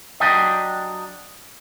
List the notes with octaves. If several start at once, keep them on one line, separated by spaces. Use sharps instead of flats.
F#3 D4 G4 D#5